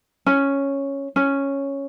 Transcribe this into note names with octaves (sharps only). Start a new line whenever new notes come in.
C#4
C#4